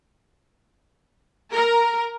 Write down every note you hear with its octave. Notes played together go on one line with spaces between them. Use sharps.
A#4